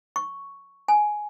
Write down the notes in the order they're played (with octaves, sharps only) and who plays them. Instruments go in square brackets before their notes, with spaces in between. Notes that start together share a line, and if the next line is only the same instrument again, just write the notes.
[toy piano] C#6
G#5